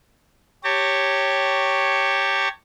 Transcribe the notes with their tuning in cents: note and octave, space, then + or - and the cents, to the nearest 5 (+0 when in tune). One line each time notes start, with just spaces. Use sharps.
G4 +0 C#5 +0 A5 +40